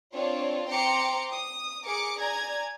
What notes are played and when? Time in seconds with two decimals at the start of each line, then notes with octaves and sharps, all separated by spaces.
0.14 C4 D4 F4 C#5
0.69 C4 G5 A#5 C6 D6 C#7
1.32 D#6
1.86 G#4 A#4 D6 C#7
2.18 D5 G#5 A#5 G#6